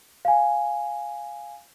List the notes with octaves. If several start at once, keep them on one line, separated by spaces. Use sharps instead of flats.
F5 G#5